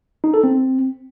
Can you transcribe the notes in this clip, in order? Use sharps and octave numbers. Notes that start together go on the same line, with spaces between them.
D#4
A4
C4